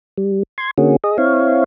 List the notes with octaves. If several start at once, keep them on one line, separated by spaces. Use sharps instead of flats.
G3
C6 G#6
D3 A#3 C#4 F#4 G#4
G#4 D#5
C4 E4 C#5 F5